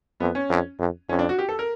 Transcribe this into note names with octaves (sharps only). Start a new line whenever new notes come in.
F2 B3
C#4
F2
F2
F2 C#4
D4
F#4
G4
A4
A#4